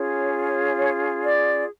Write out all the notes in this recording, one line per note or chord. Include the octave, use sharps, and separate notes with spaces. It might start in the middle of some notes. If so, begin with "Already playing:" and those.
Already playing: C#4 F4 G#4 C#5
C#5
D5